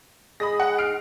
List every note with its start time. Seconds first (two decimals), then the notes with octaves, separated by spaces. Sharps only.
0.40 G#3 B5 D#6 A#6
0.60 F#5
0.78 F6 C7 D7